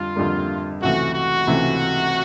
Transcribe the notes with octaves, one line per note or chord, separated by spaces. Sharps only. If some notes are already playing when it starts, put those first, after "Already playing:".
Already playing: F2 D3 G3 F4
F2 D3 G3 A#3
C#2 C3 E3 A3 F#4
F#4
C#2 C3 E3 A3